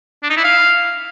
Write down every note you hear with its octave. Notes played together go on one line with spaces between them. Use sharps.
D4
D#4
E4
F5